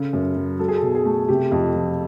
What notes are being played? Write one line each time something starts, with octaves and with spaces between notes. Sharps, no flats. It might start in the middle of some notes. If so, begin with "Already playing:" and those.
Already playing: C#3 A4
F#2
F#3
F#3 A4
G#4
A4
B2
G#4
A3
C3 G4
F2
F3